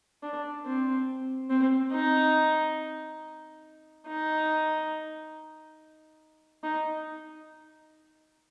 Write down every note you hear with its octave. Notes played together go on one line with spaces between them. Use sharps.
D4
C4
C4
D#4
D#4
D#4